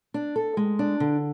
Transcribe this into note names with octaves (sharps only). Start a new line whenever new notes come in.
D4
A4
G#3
D4
D3